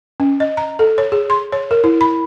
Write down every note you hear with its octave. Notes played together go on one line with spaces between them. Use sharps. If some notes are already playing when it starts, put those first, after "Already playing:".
C#4
D#5
A#5
A4
C#5
G#4
C6
C#5
A#4
E4
B5